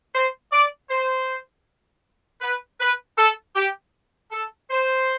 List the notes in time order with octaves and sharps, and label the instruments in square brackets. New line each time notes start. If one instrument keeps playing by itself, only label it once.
[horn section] C5
D5
C5
B4
B4
A4
G4
A4
C5